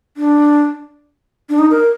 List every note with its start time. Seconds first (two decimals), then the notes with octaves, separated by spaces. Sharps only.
0.17 D4
1.50 D4
1.59 D#4
1.71 A#4